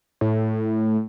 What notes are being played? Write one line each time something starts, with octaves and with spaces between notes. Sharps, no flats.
A2